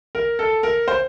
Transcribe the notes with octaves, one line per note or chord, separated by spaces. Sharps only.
A#4
A4
A#4
C5